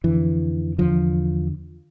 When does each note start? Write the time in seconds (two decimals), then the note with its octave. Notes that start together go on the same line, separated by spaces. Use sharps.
0.04 F2 D3 E3
0.78 E2 D3 F3